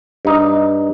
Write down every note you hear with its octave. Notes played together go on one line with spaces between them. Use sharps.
G2 D#4